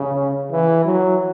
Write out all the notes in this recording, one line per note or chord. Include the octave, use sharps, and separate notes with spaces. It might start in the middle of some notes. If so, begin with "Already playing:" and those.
Already playing: C#3
E3
F#3